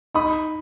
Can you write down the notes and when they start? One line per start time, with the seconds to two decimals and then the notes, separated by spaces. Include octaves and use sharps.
0.14 D#4 B5 D#6